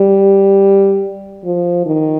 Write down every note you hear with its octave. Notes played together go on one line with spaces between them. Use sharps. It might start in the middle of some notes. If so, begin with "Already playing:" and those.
Already playing: G3
F3
D#3